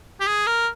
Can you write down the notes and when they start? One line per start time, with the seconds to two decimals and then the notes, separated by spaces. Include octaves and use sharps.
0.20 G4
0.27 G#4
0.47 A#4